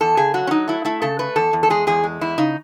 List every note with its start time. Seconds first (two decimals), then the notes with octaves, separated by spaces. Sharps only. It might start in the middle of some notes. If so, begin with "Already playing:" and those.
0.01 E2 A4
0.17 C#3 G#4
0.34 F#3 F#4
0.47 C#4
0.51 F#3 D#4
0.68 A3 E4
0.85 A3 E4
1.02 C#3 A4
1.19 A3 B4
1.36 E2 A4
1.53 E2
1.63 A4
1.70 G#3 G#4
1.87 E2 G#4
2.03 G#3
2.21 E2 E4
2.38 C#3 D#4